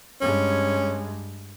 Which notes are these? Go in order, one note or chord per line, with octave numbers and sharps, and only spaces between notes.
G2 G#3 C#4